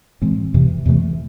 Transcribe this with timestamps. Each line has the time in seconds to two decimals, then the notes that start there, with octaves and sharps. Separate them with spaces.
0.22 A2 E3 G#3 C4
0.54 E2 C3 E3
0.86 E2 C3 E3 A3